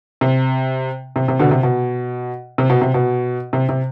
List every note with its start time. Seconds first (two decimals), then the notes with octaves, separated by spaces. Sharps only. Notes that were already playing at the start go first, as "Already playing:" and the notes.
0.21 C3
1.16 C3
1.28 C3
1.39 B2 D3
1.51 C3
1.63 B2
2.58 C3
2.70 B2
2.81 C3
2.94 B2
3.53 C3
3.69 C3